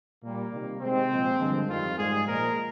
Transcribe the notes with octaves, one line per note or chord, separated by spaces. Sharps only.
A#2 G3 A#3
C3 D#3 G3
C3 D#3 G#3 C4
A#2 F3 G#3
G2 D3 F3 G#3
F2 D#3 G3 F4
G#2 G3 G#4
A#2 F3 G#3 A#4